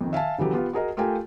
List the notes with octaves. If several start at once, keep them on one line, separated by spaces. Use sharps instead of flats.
F2 D#3
E5 F5 G#5 A5
C#3 E3 F#3 G4 A4
B3 F4 G4 F5
F#4 G#4 A#4 D#5
A3 F4 G4 A#4 G5 G#5